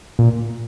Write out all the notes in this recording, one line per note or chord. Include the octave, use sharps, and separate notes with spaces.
A#2